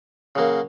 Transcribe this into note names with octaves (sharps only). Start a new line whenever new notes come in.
C#3 F#3 A#3